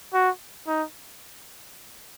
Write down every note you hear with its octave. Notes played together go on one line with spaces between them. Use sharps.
F#4
D#4